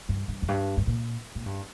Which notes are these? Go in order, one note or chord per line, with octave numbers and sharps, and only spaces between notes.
G2
G2
F2
G2
G2
A#2
A#2
G2